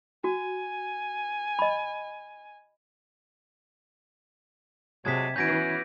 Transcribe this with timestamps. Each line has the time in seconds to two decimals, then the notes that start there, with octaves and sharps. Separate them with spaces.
0.24 F#4 G#5
1.59 D#5 B5
5.05 C3 F#3 G#3 A5 G#6 B6
5.36 E3 B3 C#4 F#4 G6 A#6 D7